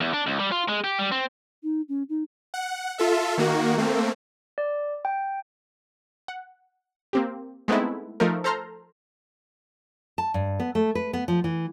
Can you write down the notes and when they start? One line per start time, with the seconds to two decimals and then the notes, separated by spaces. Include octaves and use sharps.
0.01 E2
0.14 D4
0.27 C#2
0.39 G3
0.52 F4
0.68 G#3
0.84 G4
0.98 G3
1.12 C4
1.63 D#4
1.89 C#4
2.09 D#4
2.54 F#5
2.98 F4 A4 E5
3.38 D#3 A#3 F#4
3.78 A3 A#3 C4
4.58 D5
5.05 G5
6.28 F#5
7.13 A#3 C4 G4
7.68 G#3 A3 B3 C4 D#4 E4
8.20 F3 A3 D#4 A#4
8.44 A4 C5 A5 A#5 C6 F6
10.18 A5
10.34 G2
10.60 B3
10.75 A3
10.95 B4
11.13 B3
11.28 F3
11.44 E3